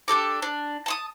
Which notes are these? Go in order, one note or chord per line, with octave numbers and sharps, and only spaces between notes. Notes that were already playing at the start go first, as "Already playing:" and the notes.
D4 G4 A4 D6
D4
A5 C6 D#6